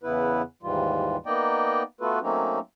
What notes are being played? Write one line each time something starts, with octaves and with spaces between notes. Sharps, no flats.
E2 C#3 B3 E4 B4
D#2 G#2 E3 G3 F4
A#3 B3 D#4 D5 D#5 G5
A3 B3 F4 F#4 A4 B4
F#3 A3 A#3 C4 C#4 D#4